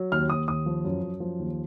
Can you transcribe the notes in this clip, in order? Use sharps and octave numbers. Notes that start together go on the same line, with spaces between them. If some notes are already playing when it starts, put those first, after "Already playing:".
Already playing: F#3
D#2 F6
D#2 D#6
D#2 D#6
F3
F#2
F#2
F3
D#2